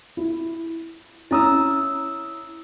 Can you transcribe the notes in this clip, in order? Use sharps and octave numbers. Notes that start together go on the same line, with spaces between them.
E4
C#4 E4 A#5 D#6 E6